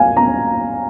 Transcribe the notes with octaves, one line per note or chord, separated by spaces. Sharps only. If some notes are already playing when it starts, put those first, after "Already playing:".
Already playing: F5 G#5
A#5